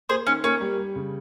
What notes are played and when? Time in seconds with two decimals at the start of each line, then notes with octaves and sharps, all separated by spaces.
0.09 A#3 G#4 C5
0.27 D#3 C#4
0.44 A#3 C#4
0.61 G3
0.78 G3
0.96 C#3